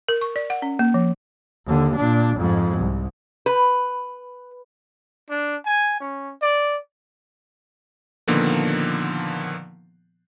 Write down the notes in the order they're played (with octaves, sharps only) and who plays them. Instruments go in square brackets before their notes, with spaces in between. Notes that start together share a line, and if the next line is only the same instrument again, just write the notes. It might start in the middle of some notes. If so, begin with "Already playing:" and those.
[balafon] A#4
C#6
D5
F#5
C#4
A#3
F3
[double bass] D#2 D3
A#2 D4
F2 G#2
C2
[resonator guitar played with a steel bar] B4
[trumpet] D4
G#5
C#4
D5
[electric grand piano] A#2 D3 D#3 F3 A#3 B3